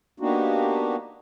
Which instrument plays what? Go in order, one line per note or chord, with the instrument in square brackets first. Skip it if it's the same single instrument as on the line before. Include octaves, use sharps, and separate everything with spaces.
[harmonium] A#3 B3 D4 D#4 F#4 G4